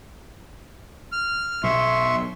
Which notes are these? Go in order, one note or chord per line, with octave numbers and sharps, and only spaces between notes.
F6
B1 E5 C6 C#6